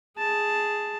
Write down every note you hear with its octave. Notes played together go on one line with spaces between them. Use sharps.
G#4 A5